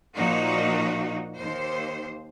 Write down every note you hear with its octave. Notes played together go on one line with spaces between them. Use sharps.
A#2 F3 D#4 F#4
D#2 C5